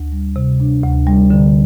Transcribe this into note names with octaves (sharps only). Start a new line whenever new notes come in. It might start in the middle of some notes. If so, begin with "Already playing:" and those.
Already playing: D2
G3
C3
D4
D2
G3
D3